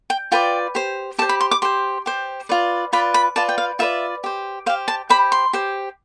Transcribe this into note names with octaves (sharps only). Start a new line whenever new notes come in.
G5
F4 B4 D5 G5
G4 C5
G4 C5 A5
B5
C6
D6
G4 C5 C6
G4 C5
F4 B4 D5
F4 B4 D5 B5
B5
F4 B4 D5 A5
G5
F5
F4 B4 D5 E5
G4 C5
G4 C5 F5
A5
G4 C5 B5
C6
G4 C5